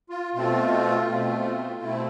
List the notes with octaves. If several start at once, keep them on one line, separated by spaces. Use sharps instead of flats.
F4
B2 A3 C4 F4
B2 A3 C4
B2 A3 C4 E4